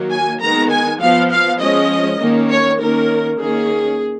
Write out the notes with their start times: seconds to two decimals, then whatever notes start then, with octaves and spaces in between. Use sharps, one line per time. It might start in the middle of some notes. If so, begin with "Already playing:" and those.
Already playing: D#3 F#3 A#3
0.12 G#5
0.42 D#3 G#3 B3 A#5
0.71 G#5
1.01 F3 B3 F5
1.31 F5
1.60 F3 G#3 C#4 D#5
2.21 D#3 A#3 C#4
2.50 C#5
2.80 D#3 A#3 C#4 A#4
3.40 D#3 A#3 C#4 G#4